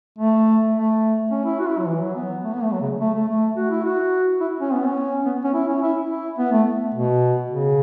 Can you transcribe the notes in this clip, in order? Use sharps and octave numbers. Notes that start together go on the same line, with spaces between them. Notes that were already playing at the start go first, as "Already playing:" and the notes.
A3
A3
C#4
E4
F#4
E4
F#3
E3
F#3
B3
A3
B3
A3
F#3
C#3
A3
A3
A3
F#4
E4
F#4
E4
C#4
B3
C#4
B3
C#4
E4
C#4
E4
E4
B3
A3
B2
C#3